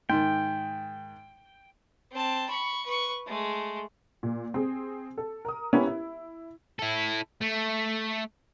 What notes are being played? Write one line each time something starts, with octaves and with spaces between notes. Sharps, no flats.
G#2 D#3 G5
C4 A5
B5 C#6
B4 C#6
G#3 A3
A#2
C4 G#4
A4
A#4 D#6
B3 C#4 E4 G4 A#4 B5
E4
E4 A4
A3